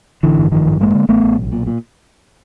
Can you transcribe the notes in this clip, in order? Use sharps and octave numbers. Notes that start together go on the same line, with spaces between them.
A1 D3 E3
G2
A1 D#3 F3
G2
A1 G#3 A#3
D3
A1 A3 B3
A1
B1
A#2
A#2